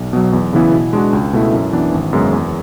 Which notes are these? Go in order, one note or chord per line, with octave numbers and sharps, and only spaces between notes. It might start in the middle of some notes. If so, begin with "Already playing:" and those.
Already playing: B1
B2 F#3
E2
C#3 E3 B3 E4
B2
G#3 D4 F#4
C#2
B2 A3 E4
F#2
E3 B3 D4
G#1
F#2 C#3 G#3 B3
E2